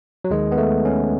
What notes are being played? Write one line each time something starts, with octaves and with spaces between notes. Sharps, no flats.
F#3
D#2 D#3 G#3
B3
A3
C#4